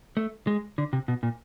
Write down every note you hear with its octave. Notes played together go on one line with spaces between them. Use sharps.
A3
G#3
D3
C3
B2
A#2